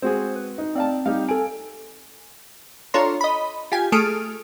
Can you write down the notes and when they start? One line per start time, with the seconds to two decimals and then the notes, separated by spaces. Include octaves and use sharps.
0.02 G#3 C4 F#4 G#4 C5
0.36 B4
0.58 D#4
0.75 C4 D5 F5 A5
1.06 G3 D#4 G4 F5
1.29 A4 G#5 D7
2.94 D4 F4 A4 C#5 A#5 C6
3.21 D#5 B5
3.72 F4 G4 G#5
3.92 A3 G#4 A4 D#6 F6 D7